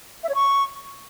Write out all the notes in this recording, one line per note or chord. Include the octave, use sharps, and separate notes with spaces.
E5
C#5
C#6